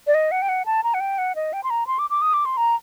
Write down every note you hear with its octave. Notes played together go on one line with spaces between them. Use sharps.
D5
D#5
F#5
G5
F#5
A5
A#5
F#5
G5
F#5
D#5
G5
C6
A#5
C6
D6
D6
D#6
D6
C6
A#5